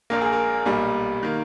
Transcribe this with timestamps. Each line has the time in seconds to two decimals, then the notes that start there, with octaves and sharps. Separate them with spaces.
0.10 A#1 A#2 A#3 A#4
0.21 G#4
0.33 A#4
0.66 B1 A#2 G3
1.23 D#3 A#3